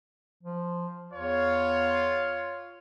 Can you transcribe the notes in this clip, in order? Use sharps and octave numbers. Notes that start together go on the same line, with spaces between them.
F3
E2 F4 C#5